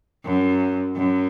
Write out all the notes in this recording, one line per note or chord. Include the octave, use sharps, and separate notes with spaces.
F#2
F#2